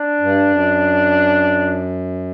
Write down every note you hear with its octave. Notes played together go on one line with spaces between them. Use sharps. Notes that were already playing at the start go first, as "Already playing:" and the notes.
Already playing: D4
G2
F#2